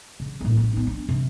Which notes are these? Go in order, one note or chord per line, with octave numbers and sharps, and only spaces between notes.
C#3
A2 A#3
A1
B3 D#4
D4
C3